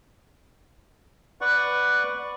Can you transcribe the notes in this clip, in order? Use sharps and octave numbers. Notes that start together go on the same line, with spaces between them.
B4 D5 F#5 C#6